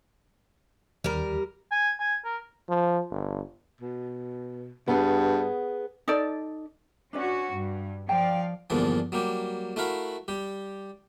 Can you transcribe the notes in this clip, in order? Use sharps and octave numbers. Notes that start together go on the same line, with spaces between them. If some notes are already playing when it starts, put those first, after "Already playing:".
D#2 G3 A#4
G#5
G#5
A#4
F3
G1
B2
G2 B3 G#4
D#4 A4 D5
C#4 D4 F#4 B4 D5
G2
F3 D5 F5 G5 A5
E2 G2 A#2 D3 E3 F3
F#3 G3 A#3 G4
A3 E4 F#4 A#4 F5 B5
G3 G4